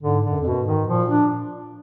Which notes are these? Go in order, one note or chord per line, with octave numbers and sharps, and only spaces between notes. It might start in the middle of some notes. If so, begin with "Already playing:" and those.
G#2 D3
D3
F#2
F2
B2
F#2
G#2
D#3
A#2 F3
D4